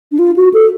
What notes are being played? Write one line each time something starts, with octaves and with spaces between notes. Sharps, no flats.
D4
F4
F#4
A4